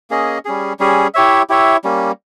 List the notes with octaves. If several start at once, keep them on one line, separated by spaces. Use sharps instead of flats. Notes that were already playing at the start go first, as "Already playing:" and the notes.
A#3 C#4 G#4 D#5
G3 C#4 G#4
G3 C#4 G#4
E4 G4 C#5 E5
E4 G4 C#5 E5
G3 A#3 C#4